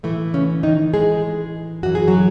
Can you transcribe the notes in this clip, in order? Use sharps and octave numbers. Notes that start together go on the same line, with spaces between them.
A2 E3 A3
C#3 C#4
D#3 D#4
G#3 G#4
F#2 E3 F#4
G#4
F#3 F#4